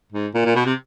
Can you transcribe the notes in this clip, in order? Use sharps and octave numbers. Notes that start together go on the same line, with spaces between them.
G#2
A#2
A#2
B2
C3